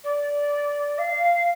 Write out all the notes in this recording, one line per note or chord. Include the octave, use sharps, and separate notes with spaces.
D5
F5